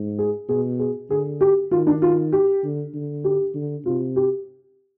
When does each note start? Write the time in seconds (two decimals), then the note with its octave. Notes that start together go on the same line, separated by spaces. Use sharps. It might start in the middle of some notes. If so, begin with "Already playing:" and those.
Already playing: G#2
0.19 G#4
0.49 B2 G#4
0.79 G#4
1.10 D3 G#4
1.41 G4
1.71 D#3 F4
1.87 D4
2.02 F4
2.33 G4
2.64 D3
2.94 D3
3.24 G4
3.55 D3
3.85 C3 F4
4.16 G4